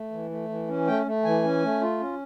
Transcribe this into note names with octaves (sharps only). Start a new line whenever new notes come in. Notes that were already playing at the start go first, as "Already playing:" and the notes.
Already playing: A3
E3
A3
E3
C#4
A3 G5
A3
E3 G#5
C#4
A3
F4
C#4